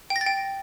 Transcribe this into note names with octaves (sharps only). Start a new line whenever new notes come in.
G5
A#6
A6
G5